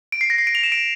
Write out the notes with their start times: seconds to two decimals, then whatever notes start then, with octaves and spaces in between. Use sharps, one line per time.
0.12 D7
0.21 C7
0.30 A#6
0.38 C7
0.47 D7
0.55 F7
0.63 E7
0.72 D7